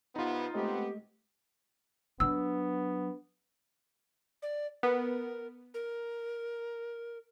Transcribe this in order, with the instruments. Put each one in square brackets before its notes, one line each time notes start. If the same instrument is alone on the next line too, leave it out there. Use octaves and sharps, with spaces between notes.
[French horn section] C3 B3 [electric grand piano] D#4 F4
[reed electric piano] G#3 A3 D#5 [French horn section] B3 C4 [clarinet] G4
[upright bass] F#3 D4 [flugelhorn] B3 [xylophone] E6
[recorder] D5
[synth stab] B3 [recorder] A#4
[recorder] A#4